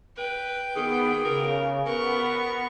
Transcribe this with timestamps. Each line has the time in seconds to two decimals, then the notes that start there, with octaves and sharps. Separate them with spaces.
0.18 B4 G5
0.76 D#3 B3 G#4
1.25 C#3 A#4
1.87 B3 A#4 B4 C#6